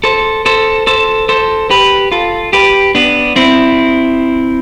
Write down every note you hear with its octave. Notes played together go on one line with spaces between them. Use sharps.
A4 C5
A4 C5
A4 C5
A4 C5
G4 B4
F4 A4
G4 B4
B3 D4
C4 E4